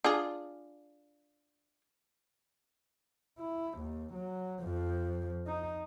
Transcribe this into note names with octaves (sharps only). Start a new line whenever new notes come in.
D4 F4 G#4
E4
D#2
F#3
F2 F3
D#4